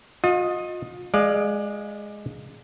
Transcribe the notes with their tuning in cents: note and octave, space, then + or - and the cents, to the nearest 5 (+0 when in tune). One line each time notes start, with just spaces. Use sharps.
F4 +40 D#5 +0
G#3 +0 D5 +25 F5 +0